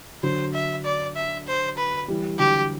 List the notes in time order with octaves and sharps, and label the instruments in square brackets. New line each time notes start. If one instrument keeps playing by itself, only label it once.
[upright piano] D3 F#3 [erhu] C5
[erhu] E5
D5
E5
C5
B4
[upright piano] E3 G3
[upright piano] D3 F#3 [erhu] G4